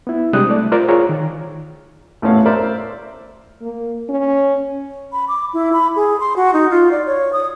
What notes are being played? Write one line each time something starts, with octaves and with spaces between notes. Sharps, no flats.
B3 E4
C3 G3 G#3 D4 D#6 F#6
A3 D5
F4 A#4 C5 D5
F4 G#4 C#5 A#5
D#3
A1 A2 B3 C#4 F5
A#4 C5 D5 E5
A#3
C#4
B5
D6
E4
B5
G#4
C6
F#4
D#4
F4
D5
C#5
D#6